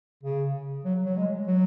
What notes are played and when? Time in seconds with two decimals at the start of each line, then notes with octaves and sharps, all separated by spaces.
0.23 C#3
0.85 F#3
1.05 F#3
1.17 G#3
1.47 F#3